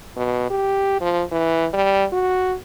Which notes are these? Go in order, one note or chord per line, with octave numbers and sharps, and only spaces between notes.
B2
G4
F3
E3
G3
F#4